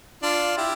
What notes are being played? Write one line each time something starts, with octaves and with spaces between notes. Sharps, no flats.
D4 F4
E4 G4